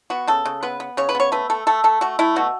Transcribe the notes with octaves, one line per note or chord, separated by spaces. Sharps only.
B3 F#4
C#3 A4
C#3
B3 B4
B3
C#3 C#5
B4
B3 C#5
A3 B4
A3 A4
A3 A4
A3 A4
A3 F#4
A3 E4
B2 F#4